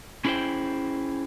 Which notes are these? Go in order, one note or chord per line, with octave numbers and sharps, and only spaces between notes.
C#4 E4 G#4 A#4 C5 G5